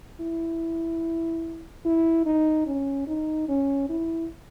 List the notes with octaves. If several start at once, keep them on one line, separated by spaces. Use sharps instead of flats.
E4
E4
D#4
C#4
D#4
C#4
E4